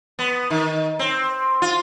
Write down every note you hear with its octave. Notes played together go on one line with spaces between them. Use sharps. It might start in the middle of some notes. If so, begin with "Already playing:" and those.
B3
D#3
C4
F4